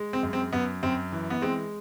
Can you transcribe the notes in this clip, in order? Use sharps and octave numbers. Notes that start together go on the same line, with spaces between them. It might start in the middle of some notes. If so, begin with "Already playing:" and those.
Already playing: G#3
C4
F#2
C4
F#2 B3
F#2 C4
E3
B3
G#3 C4